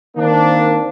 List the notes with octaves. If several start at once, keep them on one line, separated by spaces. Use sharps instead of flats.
D#3 A#3 C4 D4